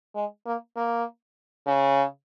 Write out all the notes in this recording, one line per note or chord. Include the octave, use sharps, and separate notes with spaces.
G#3
A#3
A#3
C#3